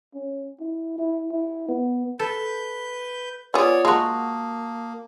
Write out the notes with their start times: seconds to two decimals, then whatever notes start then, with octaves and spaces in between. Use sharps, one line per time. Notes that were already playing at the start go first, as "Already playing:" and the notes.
0.14 C#4
0.60 E4
0.98 E4
1.31 E4
1.68 B3
2.19 A4 B4 G6
3.54 B3 F4 G#4 C#5 D5 F#5 D#6
3.85 G#3 A#3 F4 F#4 A5 A#5 D#6